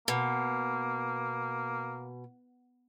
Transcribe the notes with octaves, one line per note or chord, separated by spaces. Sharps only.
B2 A#3